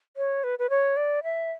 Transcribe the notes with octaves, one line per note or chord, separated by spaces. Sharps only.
C#5
B4
B4
C#5
D5
E5